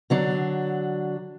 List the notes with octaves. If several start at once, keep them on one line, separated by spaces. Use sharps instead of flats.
D3 F#3 D4